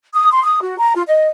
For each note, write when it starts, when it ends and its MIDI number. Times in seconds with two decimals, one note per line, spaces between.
0.14 0.30 87
0.31 0.41 84
0.43 0.60 87
0.61 0.77 66
0.78 0.94 82
0.95 1.02 65
1.07 1.28 75